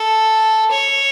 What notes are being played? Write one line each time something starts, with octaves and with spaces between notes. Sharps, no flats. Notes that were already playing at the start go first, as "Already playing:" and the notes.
Already playing: A4
C#5